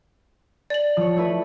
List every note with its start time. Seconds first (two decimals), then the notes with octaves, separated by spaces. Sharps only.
0.70 D5 F#7
0.97 F3 C#5
1.16 A3 E4 B4